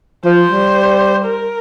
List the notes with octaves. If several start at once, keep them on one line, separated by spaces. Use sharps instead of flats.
F3 C5
G3
A#4